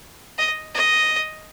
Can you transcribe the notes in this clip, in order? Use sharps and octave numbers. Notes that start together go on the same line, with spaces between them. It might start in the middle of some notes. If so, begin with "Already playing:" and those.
D#5
D#5